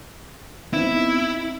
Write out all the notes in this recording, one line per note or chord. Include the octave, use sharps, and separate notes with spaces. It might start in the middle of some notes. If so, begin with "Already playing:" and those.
B3 C4 D#4 E4